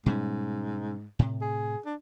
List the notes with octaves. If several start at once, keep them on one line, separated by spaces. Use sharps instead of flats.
G#2 B2 G3 C#4
A2 C3
G#4
D4